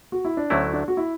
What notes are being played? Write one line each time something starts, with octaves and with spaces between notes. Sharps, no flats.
F#4
E4
D4
D2 D3 F#3 A3 C#4 E4
D4
F#4
E4